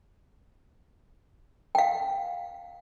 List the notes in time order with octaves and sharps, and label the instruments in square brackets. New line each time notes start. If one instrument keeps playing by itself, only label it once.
[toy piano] F5 G5